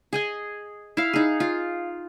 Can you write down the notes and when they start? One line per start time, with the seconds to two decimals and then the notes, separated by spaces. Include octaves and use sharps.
0.13 G#4 D#5 G#5
0.97 E4 F5
1.13 D#4 G#4
1.40 F4